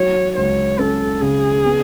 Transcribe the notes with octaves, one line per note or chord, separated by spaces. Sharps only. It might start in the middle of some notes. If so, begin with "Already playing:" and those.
Already playing: F#3 C#5
C#2 C#5
C#4 A4
C#3 G#4
B3